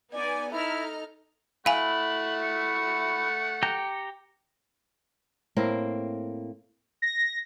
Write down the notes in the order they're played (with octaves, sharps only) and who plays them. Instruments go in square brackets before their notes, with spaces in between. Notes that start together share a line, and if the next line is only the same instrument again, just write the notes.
[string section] B3 D#4 G#5 [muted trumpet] D5
[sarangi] D#4 [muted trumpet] E4 [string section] A4 A#5 F6
[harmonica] A3 F#5 C#6 [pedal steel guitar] E4 [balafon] F5 G#5 [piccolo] F#7
[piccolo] C#7
[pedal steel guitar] G4 G5 A#5
[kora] A2 A#3 C4 A#4
[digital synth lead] A#6